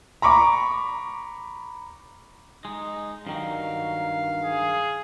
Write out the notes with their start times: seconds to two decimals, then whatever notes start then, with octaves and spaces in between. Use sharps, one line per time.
0.22 A#5 B5 C#6 D6
2.65 G#3 D#4
3.27 G2 D#3 F#3 F5
4.44 G#4